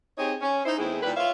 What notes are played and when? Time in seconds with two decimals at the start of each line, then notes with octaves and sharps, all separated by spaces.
0.17 C4 D#4 G4 G#4 C#5
0.42 C#4
0.64 D#4 E4 C5
0.78 E2 G#3 A3 C4 E4 G#4
1.03 A#2 D#3 G3 G4 B4
1.16 F4 C#5 E5 F5